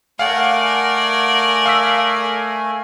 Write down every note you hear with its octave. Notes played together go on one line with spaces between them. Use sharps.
A3 A#4 D5 F5 F#5 G#5
F5 E6 B6